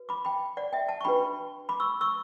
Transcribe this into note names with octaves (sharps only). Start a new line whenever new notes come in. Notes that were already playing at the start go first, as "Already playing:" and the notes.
Already playing: F#4 B4
B5 D6
G5 B5
D5 F#5
E5 G5
F#5 A5
C#6
D4 F#4 B4 G5 B5
B5 D6
C#6 E6
C#6 E6